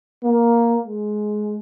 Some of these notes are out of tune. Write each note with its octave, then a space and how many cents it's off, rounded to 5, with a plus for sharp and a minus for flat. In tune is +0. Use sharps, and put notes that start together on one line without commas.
A#3 +5
G#3 +15